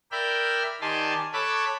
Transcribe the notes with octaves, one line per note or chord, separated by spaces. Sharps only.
A#4 D5 E5 G5 B5 F6
D#3 G4 D5 G#5 A5 C6
A4 C#5 B5 D6 E6 F#6